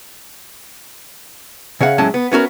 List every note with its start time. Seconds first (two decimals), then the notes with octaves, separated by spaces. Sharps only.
1.81 C#3 C#5 F5 F#5
1.98 A2 F#3 G#3 C#4 G#5 A5
2.14 B3
2.32 B3 C#4 F#4 A#4